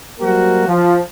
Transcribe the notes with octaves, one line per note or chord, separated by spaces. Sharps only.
F#3 G3 A#3 F#4 A#4 C5
F3